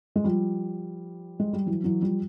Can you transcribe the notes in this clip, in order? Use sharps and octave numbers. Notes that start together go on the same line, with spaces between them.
G#3
F3 G3
G#3
G3
E3 F#3
E3 F#3
F3 G3